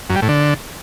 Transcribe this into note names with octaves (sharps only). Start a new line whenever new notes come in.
F#2
G3
A2
D3